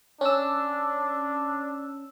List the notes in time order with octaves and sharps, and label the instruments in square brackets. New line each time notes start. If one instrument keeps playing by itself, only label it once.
[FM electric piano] C#4 E6 [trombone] D4